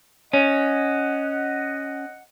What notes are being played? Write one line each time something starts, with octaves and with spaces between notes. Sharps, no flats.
C#4 D#5 F#5